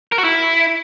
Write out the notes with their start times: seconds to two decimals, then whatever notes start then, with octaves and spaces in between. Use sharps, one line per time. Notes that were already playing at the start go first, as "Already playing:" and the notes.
0.12 A#4
0.18 F#4
0.24 E4